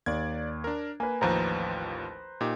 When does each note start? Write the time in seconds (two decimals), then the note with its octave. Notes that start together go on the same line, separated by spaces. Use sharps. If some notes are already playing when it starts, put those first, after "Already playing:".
0.06 D#2 D5 G#6
0.64 D4 A#4
1.00 A#3 B4 G#5
1.21 A1 D#2 F3 B4 C5 A#5
2.41 A#2 D#4 G4